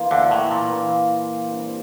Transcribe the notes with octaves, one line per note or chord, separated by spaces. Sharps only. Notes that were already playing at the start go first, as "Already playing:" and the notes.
Already playing: E3 A#3 F4
D2 D3
A2
A#2
E3 A#3 F4
C3 G3 D4 G4